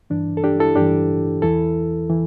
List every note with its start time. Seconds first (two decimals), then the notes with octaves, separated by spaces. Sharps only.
0.10 G2 E3 D4
0.37 A4
0.44 D4 G4
0.59 E4 A4
0.76 G2 E3 D4 G4
1.42 E2 E3 E4 A4
2.10 E3